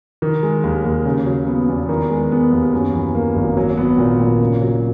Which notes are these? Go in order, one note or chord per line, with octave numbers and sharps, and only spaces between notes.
D#3
G#3
D#2
D#2
C#3
F#3
B3
E2
D#3
G#3
B3
D#2
F#2
E3
A#3
G#1
F#3
B3
A#2
A#2
C#3
F#3